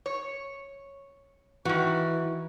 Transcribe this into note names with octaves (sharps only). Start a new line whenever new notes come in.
C#5
D#3 E3 F#4